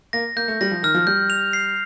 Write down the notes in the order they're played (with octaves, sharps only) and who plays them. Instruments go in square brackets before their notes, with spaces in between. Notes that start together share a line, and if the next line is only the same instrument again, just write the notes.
[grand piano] A#3 [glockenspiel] A#6
[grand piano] A#3 [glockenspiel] G6
[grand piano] A3
[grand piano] G3 [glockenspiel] A#6
[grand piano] F3
[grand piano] D#3 [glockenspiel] F6
[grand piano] F3
[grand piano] G3 [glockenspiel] G6
[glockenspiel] F7
C7